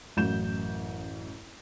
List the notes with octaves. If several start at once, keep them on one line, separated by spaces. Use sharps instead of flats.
A1 F#2 F#4 G6 E7